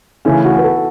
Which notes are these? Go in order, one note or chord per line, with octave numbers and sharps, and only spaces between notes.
C#3 E3 A3 C#4 E4
F#4
B4
A4